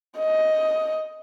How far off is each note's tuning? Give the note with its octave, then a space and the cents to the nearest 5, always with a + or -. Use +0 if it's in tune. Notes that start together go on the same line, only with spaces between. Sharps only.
D#5 +10